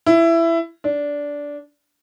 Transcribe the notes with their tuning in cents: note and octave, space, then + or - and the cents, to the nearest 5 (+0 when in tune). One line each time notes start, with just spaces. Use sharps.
E4 +15
D4 -15